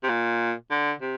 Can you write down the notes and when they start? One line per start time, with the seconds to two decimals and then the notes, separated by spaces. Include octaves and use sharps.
0.03 C3
0.09 A#2
0.71 D3
1.02 C3